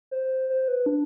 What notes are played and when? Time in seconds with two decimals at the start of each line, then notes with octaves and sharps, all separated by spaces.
0.11 C5
0.50 C5
0.68 B4
0.86 D4